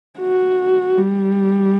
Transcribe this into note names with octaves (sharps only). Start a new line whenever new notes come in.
F#4
G3